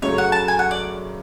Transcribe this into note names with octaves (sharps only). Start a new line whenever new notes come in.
F#2 C#3 F#3 A3 C#5
F#5
A5
G#5
F#5
D5